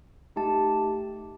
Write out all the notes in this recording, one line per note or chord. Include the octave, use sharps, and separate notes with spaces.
A3 D#4 G4 A5